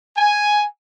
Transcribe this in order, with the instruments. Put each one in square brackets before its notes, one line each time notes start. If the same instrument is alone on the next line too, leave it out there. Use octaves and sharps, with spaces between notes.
[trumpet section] G#5